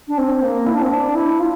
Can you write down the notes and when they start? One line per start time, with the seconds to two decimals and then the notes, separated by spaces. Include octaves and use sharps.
0.08 D4
0.18 C4
0.42 A#3
0.66 E4
0.74 D4
0.82 C4
0.90 D4
1.15 E4
1.40 F4